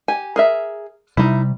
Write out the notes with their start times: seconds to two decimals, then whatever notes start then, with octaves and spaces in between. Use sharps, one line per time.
0.08 G4 G#5
0.36 G#4 A#4 E5
1.17 C3 G3 D#4 E4